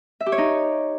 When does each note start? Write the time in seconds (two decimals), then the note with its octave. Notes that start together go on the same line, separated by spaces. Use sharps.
0.20 E5
0.26 G4
0.32 C#5
0.38 D#4